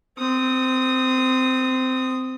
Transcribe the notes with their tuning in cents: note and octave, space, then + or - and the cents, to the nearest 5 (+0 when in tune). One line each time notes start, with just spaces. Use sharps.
C4 -15 D#6 +0